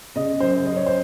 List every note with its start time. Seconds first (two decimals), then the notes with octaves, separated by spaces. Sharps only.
0.16 C#3 D#5
0.40 F#2 C5
0.66 F#2 D#5
0.76 C#5
0.86 C5